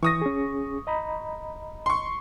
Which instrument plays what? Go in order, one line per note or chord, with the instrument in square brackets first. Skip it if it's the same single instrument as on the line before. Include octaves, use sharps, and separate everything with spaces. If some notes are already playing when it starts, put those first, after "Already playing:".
[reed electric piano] E3 [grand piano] C#6 D#6 A#6
[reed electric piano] C#4 G#4
D#5 A#5 B5
[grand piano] C6 C#6